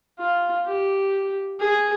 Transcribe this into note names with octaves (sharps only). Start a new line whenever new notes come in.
F4
G4
G#4